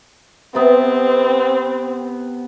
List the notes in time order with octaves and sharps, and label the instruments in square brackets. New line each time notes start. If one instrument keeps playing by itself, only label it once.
[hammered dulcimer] C3 B3 [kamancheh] C4